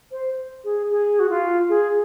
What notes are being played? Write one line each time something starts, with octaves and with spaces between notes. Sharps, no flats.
C5
G#4
G#4
F#4
F4
G#4